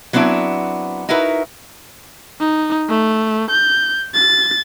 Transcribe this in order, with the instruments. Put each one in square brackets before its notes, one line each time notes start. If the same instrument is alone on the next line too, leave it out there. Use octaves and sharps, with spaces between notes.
[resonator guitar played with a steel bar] F#3 B3 C4 D4 E4
D#4 E4 F#4 A#4 B4 E5
[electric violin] D#4
A3
G6
A6